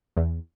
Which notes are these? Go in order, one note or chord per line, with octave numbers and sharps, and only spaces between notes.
E2